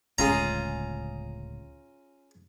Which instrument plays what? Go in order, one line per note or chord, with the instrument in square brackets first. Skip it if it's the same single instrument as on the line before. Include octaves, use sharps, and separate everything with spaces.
[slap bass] D1 C#2 C#3 [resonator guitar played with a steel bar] C#4 F4 G#4 [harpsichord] A#5